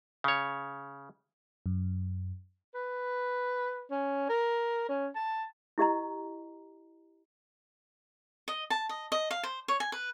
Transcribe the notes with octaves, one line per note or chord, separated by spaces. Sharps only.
C#3 C#5
F#2
B4
C#4
A#4
C#4
A5
E4 G4 D#5 A#5
D#5
A5
D#5
D#5
F5
C5
C#5
G#5
B4